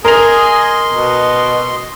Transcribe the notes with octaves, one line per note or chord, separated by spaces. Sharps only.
G#4 A#4 D#5 C6 F7
B2